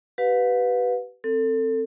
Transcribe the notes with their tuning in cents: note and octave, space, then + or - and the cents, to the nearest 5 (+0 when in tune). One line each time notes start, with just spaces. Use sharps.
G4 -35 B4 +0 F5 +40
C4 +0 A4 +25